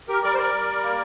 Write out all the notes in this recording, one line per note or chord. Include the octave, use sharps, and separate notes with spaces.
G4 A#4
G3 A#4 D5
C5
A#4 D5
G3
A#3